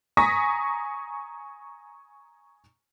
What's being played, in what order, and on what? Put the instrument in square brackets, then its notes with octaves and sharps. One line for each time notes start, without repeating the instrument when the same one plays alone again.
[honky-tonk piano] G#5 A#5 C#6 D#6 A#6 B6